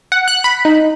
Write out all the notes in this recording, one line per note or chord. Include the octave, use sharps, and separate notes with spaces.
F#5
F#6
B5
D#4